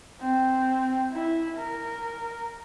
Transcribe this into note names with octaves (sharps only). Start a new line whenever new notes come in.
C4
E4
A#4